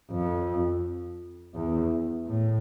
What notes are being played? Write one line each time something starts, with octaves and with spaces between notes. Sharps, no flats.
F2
E2
A2